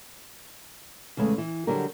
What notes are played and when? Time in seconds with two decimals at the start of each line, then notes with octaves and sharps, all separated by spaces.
1.17 E2 C#3 G#3 A3
1.38 E3
1.67 D3 F#3 G3 G4 A#4